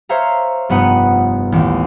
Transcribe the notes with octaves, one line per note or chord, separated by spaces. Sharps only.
C5 C#5 E5 F5 A#5
F1 G2 B3 D#4 F#5
A1 D#2